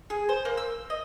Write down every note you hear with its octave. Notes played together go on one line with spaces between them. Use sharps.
G#4
C5
A#3
E6
D#5